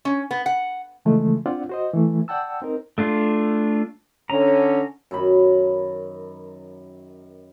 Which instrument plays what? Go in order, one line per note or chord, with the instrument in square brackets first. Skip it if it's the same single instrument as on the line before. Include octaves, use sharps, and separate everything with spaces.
[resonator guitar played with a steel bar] C#4
B3
F#5
[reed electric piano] C#3 E3 F3 G#3 A3
C4 D4 F4 D5 F#5
F#4 C5 D#5
E3 A3
D5 F#5 G5 A5 E6
C4 D#4 A#4
[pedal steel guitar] A3 D4 F4
[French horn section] D3 C#4 [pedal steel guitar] A#5
[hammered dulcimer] F#2 D#3 B5